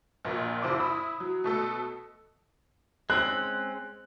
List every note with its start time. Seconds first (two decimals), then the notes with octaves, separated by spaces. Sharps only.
0.25 A#1 A#2
0.62 F#1 E4 C5 C6 D6
0.79 E4 B5 D#6 E6
1.20 F#3
1.44 B2 A3 A4
3.10 G#3 C4 C#4 F#6